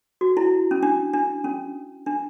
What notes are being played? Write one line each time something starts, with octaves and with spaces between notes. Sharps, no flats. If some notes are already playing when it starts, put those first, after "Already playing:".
F#4
E4
C#4
D4
D4
C#4
D4